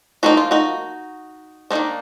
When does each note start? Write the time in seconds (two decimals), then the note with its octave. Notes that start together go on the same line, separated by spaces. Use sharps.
0.23 F3 A#3 D#4 F#4
0.37 F4
0.51 D#4 F#4
1.71 D#3 A#3 D4 D#4